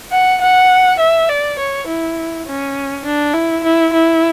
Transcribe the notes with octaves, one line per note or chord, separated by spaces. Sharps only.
F#5
F#5
E5
D5
C#5
E4
C#4
D4
E4
E4
E4